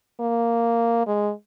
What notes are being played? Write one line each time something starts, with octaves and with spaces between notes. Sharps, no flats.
A#3
G#3